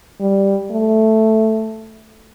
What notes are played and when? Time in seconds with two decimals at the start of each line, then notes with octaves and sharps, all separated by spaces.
0.21 G3
0.72 A3